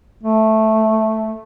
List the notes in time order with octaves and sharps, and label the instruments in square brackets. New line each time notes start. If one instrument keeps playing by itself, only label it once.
[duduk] A3